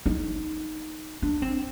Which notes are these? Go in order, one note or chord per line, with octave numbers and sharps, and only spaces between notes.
D#4
D4
C4